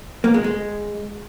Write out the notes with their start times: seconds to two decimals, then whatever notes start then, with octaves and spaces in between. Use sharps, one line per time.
0.24 A#3
0.34 G#3
0.44 G#3